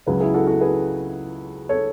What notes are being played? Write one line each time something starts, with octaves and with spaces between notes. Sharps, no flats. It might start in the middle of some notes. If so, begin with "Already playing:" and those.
C#2 C#3 F#3 G#4 B4
E4 G#4
F#4 A4
F#4 A4
G#4 B4
A4 C#5